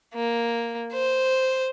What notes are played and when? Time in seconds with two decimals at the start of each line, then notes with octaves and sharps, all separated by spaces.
0.14 A#3
0.93 C5